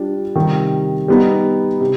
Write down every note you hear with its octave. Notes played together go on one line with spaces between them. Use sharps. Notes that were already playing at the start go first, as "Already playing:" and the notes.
Already playing: G3 D4 F4
C3 D#3 G3
G3 B3 D#4
C3